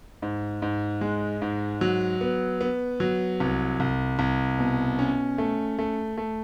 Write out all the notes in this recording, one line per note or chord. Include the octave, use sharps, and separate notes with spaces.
G#2
G#2
G#3
G#2
F#3
B3
B3
F#3
C2
C2
C2
B2
C#4
A3
A3
A3